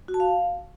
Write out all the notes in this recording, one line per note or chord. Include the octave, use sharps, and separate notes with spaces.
F#4
A5
F5